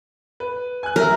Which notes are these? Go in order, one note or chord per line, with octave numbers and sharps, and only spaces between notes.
B4
G#5 F#6
F#3 A#4 E5